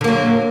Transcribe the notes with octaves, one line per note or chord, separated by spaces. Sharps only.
D3 F#3 A#3